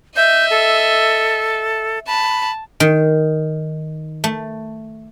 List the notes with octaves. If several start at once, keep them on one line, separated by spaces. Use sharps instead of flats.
D#5 E5 G6
A4
A5 B5
D#3
A3